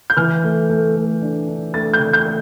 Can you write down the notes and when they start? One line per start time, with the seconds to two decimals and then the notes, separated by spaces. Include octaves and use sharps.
0.10 G6
0.17 E3 F6
0.44 A3
0.69 A3
0.96 A3
1.22 D4
1.48 D4
1.74 A3 A6
1.93 G6
2.00 E3
2.13 G6
2.26 A3